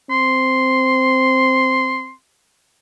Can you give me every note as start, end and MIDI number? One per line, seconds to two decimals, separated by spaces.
0.10 2.13 60
0.10 2.13 84